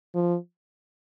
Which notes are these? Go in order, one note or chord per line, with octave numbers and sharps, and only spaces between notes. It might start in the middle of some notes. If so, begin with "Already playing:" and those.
F3